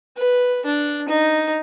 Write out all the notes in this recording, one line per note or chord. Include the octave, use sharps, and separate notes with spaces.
B4
D4
D#4